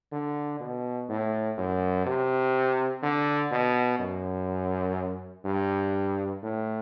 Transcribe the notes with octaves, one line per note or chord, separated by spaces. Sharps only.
D3
B2
A2
F#2
C3
D3
B2
F#2
G2
A2